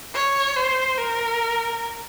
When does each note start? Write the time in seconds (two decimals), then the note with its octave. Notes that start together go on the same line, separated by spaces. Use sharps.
0.15 C#5
0.57 C5
0.97 A#4